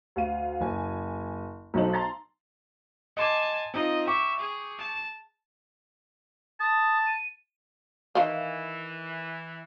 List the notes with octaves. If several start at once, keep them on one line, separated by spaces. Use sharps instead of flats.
D2 F5 D#7
F#1 G#5
B1 F#3 A3 D#4 C5 F#7
A5 A#5 C6 A6
D#5 G#5 A5 C6 D6
C4 D#4 F4 D#5
E5 G5 C#6 D6
G#4
A5
A5 D#6
D#7
D#3 E3 F5